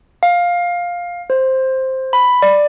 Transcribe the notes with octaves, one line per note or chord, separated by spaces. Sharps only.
F5
C5
B5
D5